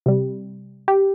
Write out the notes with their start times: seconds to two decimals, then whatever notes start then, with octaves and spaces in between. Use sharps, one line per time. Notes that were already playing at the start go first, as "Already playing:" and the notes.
0.06 C3 G3
0.88 G4